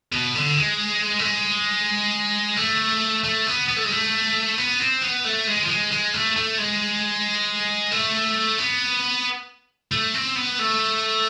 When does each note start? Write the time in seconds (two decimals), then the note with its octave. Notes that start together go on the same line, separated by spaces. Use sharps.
0.13 B2
0.35 D3
0.57 G#3
1.19 A3
1.24 G#3
2.57 A3
3.24 A3
3.47 B3
3.69 B3
3.76 A3
3.84 G#3
3.92 A3
4.58 B3
4.79 C4
5.02 B3
5.24 A3
5.47 G#3
5.63 F3
5.69 G#3
5.91 G#3
6.13 A3
6.36 A3
6.58 G#3
7.91 A3
8.58 B3
9.92 A3
10.14 C4
10.36 B3
10.59 A3